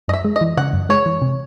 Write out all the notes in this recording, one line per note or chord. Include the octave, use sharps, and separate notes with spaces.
F#2 D#5
E5
G#3
D#5
E3
C#3 F#5
F#2
G#3 C#5
E3
C3